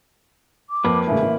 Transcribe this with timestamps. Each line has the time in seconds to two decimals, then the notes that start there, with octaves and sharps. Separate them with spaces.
0.70 D6
0.85 F2 A#3 B4
1.07 E1 A2 C#3 E5
1.22 A1